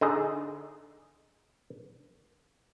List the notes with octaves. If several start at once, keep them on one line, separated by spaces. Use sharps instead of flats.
D3 D#4 G#4